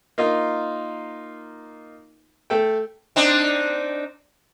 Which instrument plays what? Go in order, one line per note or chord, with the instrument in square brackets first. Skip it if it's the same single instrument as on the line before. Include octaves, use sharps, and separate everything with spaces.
[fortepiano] A#3 D#4 F4
A3 A4 G5
[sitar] C4 D4 D#4